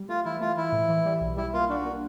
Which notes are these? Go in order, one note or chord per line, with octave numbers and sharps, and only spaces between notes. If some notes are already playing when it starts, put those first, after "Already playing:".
Already playing: G3
A3 F4
E3 E4
A3 F4
E3 E4
A2
E3
G3
B1
G3 E4
A#3 F4
D4 F#4
A#3